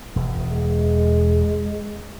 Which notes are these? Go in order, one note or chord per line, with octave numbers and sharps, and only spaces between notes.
E1 E2
G#3